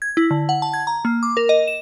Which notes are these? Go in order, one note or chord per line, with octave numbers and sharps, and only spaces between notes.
G#6
E4
D3
F#5
A5
G#6
A#5
A#3
D6
A#4
D#5
E7